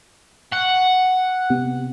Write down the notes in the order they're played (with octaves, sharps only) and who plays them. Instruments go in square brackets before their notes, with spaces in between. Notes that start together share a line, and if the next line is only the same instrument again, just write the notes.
[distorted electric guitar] F#5 [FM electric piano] C#6 F#6
[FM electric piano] C3 B3 G4